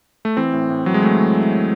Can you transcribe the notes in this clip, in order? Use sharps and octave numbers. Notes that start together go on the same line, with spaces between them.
A3
E3 C4
A2
A2
E3 F#3
G#3
E3 A3
A2